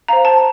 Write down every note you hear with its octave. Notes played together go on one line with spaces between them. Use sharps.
C5 F5 A#5
A5